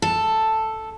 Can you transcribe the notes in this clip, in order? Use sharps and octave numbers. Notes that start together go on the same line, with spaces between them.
A4